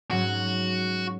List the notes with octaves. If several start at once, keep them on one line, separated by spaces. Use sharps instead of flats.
G#2 F#3 C#4 F#4